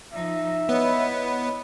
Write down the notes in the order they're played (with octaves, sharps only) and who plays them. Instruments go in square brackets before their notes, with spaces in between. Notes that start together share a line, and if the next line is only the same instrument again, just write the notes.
[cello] F3 D#4 [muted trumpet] E5
[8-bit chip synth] B3 [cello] E4 B4 [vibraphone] C#5 D#5 B5